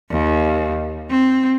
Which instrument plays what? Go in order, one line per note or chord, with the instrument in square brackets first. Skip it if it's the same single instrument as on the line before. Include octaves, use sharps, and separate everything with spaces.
[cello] D#2
C4